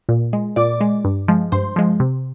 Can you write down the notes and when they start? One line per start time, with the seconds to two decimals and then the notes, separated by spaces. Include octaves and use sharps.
0.09 A#2
0.33 G#3
0.56 A#2 D5 D6
0.81 G#3
1.05 G2
1.28 F3 G#3
1.52 G2 C5 C6
1.76 F3 G#3
2.00 C3